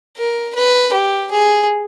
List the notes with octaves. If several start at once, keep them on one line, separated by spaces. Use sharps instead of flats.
A#4
B4
G4
G#4